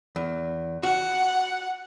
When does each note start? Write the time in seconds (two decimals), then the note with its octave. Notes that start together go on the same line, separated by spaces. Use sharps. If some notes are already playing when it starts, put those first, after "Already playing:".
0.16 E2
0.83 F#4 F#5